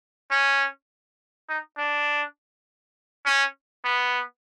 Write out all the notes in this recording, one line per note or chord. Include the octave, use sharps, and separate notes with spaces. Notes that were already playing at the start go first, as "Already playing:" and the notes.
C#4
D#4
D4
C#4
B3